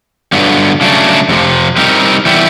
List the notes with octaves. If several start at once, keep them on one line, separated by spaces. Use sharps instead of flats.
G2 D3 F#3 B3
C#3 F#3 A3 D4
F2 C3 F3
G3 C4 D#4 G4 A#4
E3 G3 B3 E4 G4